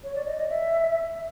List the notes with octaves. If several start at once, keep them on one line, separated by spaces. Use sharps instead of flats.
C#5
D5
D#5
D#5
E5